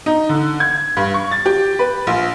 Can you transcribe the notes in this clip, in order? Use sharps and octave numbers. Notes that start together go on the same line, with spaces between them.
D#4
D3
G#6
G2
C#6
A6
G4
B4
A#1